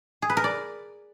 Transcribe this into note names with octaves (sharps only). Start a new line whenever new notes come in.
G#4
B4
A#4
D5